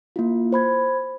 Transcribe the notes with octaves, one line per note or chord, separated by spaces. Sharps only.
A#3 E4 F4
C5 B5 G#6